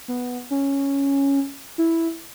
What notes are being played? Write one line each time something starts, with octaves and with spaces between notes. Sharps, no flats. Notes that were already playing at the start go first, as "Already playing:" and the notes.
B3
C#4
E4